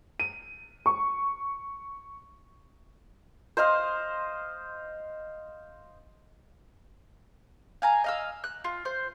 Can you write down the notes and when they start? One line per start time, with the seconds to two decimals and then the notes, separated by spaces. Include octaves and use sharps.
0.20 D#7
0.86 C#6
3.57 C5 D#5 F5 C6
7.82 F5 G#5 A#5
8.04 D#5 F5 E6
8.44 F#6
8.64 F4
8.85 C5